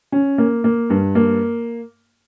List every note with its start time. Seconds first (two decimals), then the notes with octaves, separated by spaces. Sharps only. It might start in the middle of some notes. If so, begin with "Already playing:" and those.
0.12 C#4
0.38 A#3
0.64 A#3
0.90 G2
1.15 A#3